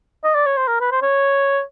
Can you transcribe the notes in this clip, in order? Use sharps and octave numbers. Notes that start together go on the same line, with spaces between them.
D#5
D5
C#5
C5
A#4
B4
C5
C#5